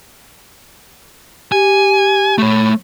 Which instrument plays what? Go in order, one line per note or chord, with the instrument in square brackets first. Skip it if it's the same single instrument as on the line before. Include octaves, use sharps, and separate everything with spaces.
[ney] G4 [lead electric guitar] G#5
[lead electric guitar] A3 C#5